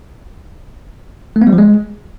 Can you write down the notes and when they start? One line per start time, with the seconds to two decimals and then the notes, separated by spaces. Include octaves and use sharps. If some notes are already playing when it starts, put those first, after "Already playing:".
1.36 A3
1.42 B3
1.47 G3
1.53 F3
1.58 G#3